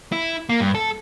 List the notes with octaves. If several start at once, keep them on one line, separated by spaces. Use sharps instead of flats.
E4
A#3
G2
A4